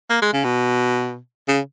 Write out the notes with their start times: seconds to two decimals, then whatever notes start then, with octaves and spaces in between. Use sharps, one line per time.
0.10 A#3
0.22 G#3
0.33 C#3
0.44 B2
1.48 C#3